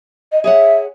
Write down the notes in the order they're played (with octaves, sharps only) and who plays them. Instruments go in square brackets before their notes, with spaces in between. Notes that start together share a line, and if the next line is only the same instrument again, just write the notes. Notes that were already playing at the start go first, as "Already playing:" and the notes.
[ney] D#5
[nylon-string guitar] G#4 C#5 F#5 [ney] E5